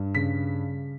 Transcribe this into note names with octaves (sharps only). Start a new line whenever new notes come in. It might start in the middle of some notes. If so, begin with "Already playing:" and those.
Already playing: G2
C#3 B6